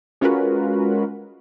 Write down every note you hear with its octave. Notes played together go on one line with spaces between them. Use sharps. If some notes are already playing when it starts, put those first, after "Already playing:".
G#3 C#4 F4 F#4 A#4 B4